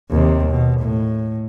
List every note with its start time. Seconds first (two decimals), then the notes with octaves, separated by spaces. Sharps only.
0.11 D#2 C3
0.50 B2
0.81 A2